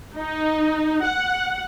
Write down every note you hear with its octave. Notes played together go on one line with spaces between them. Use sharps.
D#4
F#5